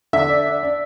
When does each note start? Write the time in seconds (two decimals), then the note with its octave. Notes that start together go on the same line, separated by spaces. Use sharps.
0.13 D3 E5
0.29 D4
0.46 D4
0.63 D4